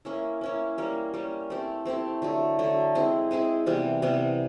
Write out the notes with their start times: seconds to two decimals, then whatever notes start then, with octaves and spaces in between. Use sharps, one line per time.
0.05 A#3 C#4 E4
0.41 A#3 C#4 E4
0.78 G3 A#3 C#4
1.14 G3 A#3 C#4
1.50 A3 C4 E4 G4
1.85 A3 C4 E4 G4
2.22 D3 F#3 A3
2.59 D3 F#3 A3
2.95 G#3 C4 E4 G#4
3.31 G#3 C4 E4 G#4
3.66 C3 E3 G3 B3
4.02 C3 E3 G3 B3